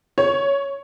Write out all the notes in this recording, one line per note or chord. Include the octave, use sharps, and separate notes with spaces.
C#5